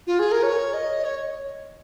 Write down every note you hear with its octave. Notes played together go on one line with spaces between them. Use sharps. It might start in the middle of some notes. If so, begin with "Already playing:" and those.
F4
G#4
A#4
C#5
D#5
C#5